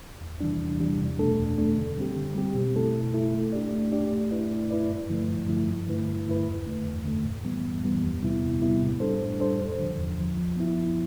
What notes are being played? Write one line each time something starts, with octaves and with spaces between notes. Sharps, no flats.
E2
C3 E3 G3 D4
E2
C3 E3 G3 D4
E2
B2 A3 D4 A4
E2
B2 A3 D4 A4
D3
G3 C4 G4
D3
G3 C4 G4
B2
A3 E4 A4
B2
A3 E4 A4
A3
D4 G4 D5
A3
D4 G4 D5
A3
E4 B4 D5
A3
E4 B4 D5
G2
D3 F3 A3 E4
G2
D3 F3 A3 E4
G2
D3 A3 E4 B4
G2
D3 A3 E4 B4
E2
D3 A3
E2
D3 A3
A2
E3 G3 B3
A2
E3 G3 B3
E2
C3 G3 B3 E4
E2
C3 G3 B3 E4
A2
G3 D4 A4 C5
A2
G3 D4 A4 C5
E2
D3 F3
E2
D3 F3
F3
B3 E4
F3